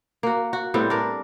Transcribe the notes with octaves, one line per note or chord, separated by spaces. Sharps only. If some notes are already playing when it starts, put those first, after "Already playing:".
A#3 F#4
F#4
A2 G3 B3 C4
D4 A#4